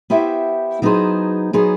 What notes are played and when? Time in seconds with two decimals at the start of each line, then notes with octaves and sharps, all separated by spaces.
0.10 B3 E4 G4 C5 E5
0.82 F#3 B3 D#4 G#4 C5
1.53 F#3 B3 D#4 G#4 C5